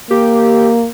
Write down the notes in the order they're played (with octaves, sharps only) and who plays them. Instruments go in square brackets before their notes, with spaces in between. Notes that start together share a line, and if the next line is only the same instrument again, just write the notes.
[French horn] A#3 [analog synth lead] G4